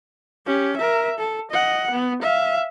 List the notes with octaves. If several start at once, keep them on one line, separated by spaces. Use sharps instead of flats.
C#4 G4
A#4 E5
A4
D#5 F#5
B3
E5 F5